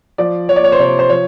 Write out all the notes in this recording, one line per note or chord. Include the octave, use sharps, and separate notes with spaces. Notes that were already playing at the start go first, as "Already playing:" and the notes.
F3 D5
F3 C#5
D5
C#5
C5
C3 C#5
C5
F3 C#5